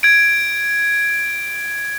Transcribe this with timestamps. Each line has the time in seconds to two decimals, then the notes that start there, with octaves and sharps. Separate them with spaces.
0.03 G#6 D7